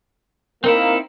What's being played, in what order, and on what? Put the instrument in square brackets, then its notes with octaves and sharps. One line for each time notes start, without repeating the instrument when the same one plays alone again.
[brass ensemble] A#3 [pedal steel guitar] C4 D#4 E4